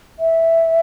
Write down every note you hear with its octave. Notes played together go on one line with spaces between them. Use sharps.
E5